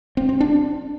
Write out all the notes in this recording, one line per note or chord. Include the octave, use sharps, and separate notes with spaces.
C4
C4
D4